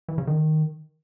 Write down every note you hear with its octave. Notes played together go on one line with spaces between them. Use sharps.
E3
C#3
D#3